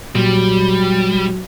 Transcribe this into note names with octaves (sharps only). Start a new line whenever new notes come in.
A#2 F#3 G3